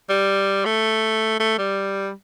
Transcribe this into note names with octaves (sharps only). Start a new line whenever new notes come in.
G3
A3
A3
G3